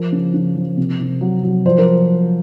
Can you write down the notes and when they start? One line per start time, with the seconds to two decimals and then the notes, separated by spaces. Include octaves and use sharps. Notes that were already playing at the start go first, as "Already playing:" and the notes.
Already playing: F3 A#4
0.12 C#3
0.34 C#3
0.55 F3
0.77 C3
1.00 C3
1.21 F#3
1.43 F#3
1.66 F3 C5
1.78 A#4